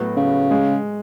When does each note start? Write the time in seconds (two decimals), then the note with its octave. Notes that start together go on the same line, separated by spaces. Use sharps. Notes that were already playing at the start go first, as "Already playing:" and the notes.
Already playing: A2 F#3 B3 F#4
0.17 C#3
0.51 G#3